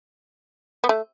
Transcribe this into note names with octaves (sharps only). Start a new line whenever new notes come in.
B3
A3